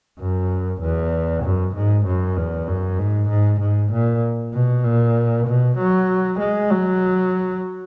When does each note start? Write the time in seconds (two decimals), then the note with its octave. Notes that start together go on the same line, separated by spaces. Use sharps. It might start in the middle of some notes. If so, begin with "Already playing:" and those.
0.20 F#2
0.82 E2
1.44 F#2
1.75 G#2
2.06 F#2
2.37 E2
2.67 F#2
2.99 G#2
3.29 G#2
3.61 G#2
3.92 A#2
4.53 B2
4.84 A#2
5.47 B2
5.78 F#3
6.40 G#3
6.71 F#3